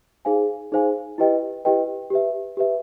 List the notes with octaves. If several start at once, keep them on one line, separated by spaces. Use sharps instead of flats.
D#4 G#4 C5 F5 G#5
D#4 G#4 C5 F5 G#5
E4 G4 B4 D#5 G5
E4 G4 B4 D#5 G5
G4 B4 E5
G4 B4 E5